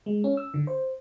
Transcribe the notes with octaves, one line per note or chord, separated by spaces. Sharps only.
G#3
C#4
E6
D3
C5